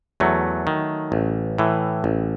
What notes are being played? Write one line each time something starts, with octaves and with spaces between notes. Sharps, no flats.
E2 F#3 A3
D#3
A1
A2 E3
A1